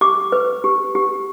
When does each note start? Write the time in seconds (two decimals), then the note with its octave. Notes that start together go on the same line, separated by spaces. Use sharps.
0.01 G4 D6
0.32 B4
0.64 G4
0.95 G4